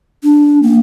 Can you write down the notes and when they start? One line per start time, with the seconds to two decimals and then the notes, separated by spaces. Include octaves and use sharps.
0.24 D4
0.63 A#3